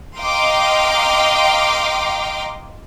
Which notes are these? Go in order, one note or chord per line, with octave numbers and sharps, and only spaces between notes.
D#5 F5 G5 A#5 C6 D6